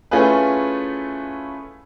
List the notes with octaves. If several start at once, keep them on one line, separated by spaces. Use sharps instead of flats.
A3 C#4 E4 F4 G#4 B4